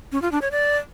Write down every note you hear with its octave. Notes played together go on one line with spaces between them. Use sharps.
C#4
F4
D4
C#5
D5